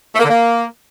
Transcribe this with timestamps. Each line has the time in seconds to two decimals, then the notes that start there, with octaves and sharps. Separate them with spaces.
0.14 A3
0.19 A#3
0.24 D3
0.30 A#3